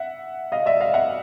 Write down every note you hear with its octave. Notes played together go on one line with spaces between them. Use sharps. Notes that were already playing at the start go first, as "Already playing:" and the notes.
Already playing: E5 F#5
D#5 F5
D5 E5
D#5 F5
E5 F#5